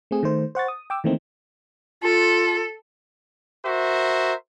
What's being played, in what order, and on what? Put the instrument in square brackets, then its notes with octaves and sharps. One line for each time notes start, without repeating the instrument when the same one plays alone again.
[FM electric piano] A3 C4 G#4
D#3 A3 C5
C5 F#5 C#6 A6
D#6
G5 D6 E6
D#3 E3 A3 A#3 C4 D#4
[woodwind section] F4 [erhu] A4
[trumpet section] F#4 A#4 C5 E5